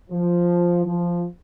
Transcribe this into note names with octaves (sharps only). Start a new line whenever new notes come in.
F3
F3